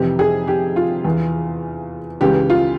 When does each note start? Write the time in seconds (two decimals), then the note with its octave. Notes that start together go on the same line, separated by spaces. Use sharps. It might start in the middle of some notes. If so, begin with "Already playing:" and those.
Already playing: F2 C3 E3 G4
0.19 G#4
0.48 G4
0.76 F4
1.05 E2 E3
2.21 C#2 C#3 E3 G4
2.50 F4